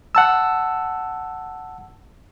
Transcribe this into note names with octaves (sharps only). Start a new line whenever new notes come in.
F#5 A5 E6